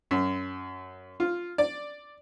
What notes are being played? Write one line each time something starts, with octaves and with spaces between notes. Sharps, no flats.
F#2
F4
D5